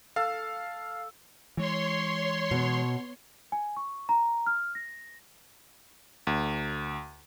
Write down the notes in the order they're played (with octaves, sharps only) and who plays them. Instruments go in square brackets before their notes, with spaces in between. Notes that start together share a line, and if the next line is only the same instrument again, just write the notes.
[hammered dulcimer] A4 [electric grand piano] F5
[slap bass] E3 G#3 [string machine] C#5 C6
[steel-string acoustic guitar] B2
[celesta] G#5
C#6
A#5
F6
A#6
[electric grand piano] D2